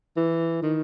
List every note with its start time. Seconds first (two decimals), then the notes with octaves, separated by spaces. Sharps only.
0.17 E3
0.62 D#3